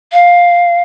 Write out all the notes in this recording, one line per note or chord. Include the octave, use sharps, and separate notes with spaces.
F5